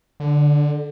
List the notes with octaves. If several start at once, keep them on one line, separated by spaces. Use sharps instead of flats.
D3